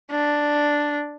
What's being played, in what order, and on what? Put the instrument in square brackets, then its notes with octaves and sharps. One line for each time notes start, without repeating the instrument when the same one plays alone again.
[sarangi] D4